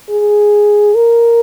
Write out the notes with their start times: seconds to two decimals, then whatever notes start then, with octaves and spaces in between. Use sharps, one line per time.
0.10 G#4
0.95 A#4